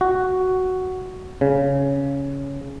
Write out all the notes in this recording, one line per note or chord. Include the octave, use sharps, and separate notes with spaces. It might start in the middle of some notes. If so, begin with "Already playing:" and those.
F#4
C#3